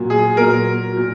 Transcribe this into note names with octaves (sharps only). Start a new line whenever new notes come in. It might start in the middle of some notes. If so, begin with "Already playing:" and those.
Already playing: A#2 F#3
G#4
A#2 F#3 A#4
A#2 F#3